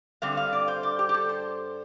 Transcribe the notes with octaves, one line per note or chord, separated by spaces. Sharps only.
G2 D3 G3 C4 F5
F5
D5
C5
D5
G4
G4
A4
C5